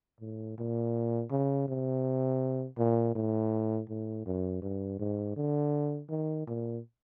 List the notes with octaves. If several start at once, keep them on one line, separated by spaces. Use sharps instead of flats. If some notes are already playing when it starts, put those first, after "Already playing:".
A2
A#2
C#3
C3
A#2
A2
A2
F#2
G2
G#2
D3
D#3
A#2